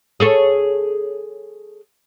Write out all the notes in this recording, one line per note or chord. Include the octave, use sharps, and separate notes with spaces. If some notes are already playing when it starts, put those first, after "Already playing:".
G#4 A4 C#5